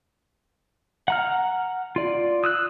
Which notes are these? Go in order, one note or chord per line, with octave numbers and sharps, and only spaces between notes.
F#5 A#5 F6
F4 D5
D#6 E6 F#6